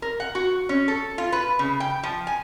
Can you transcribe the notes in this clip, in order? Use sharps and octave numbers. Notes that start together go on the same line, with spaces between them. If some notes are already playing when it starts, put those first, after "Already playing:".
A#4
F#5
F#4
C#4
A4
F4
B4
C#3
G5
F3
G#5